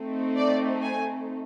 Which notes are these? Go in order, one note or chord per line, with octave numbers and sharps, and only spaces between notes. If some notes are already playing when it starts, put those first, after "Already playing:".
Already playing: A3 C4 D#4
D5
G#5